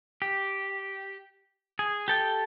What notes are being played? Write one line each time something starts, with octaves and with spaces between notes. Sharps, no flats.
G4
G#4
G4 A4 G5